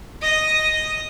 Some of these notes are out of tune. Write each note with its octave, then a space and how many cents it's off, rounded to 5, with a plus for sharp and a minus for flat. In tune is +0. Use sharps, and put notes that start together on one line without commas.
D#5 +0 D#6 -5